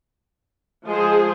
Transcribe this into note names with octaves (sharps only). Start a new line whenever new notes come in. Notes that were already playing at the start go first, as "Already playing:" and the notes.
F3 G#3 G#4 C5